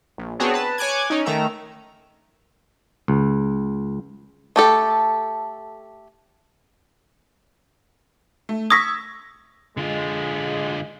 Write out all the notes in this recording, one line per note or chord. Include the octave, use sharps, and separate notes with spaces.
A#1
B3 C4 D4 F#4 G#4 C#5
B4 A5
C#5 G#5 D6 F#6 G#6
C#4 D#4
D#3 A3 A#5 E6
C#2
A3 G4 A4
A3
C#6 D#6 E6 G#6 A#6 B6
D3 G#3 F4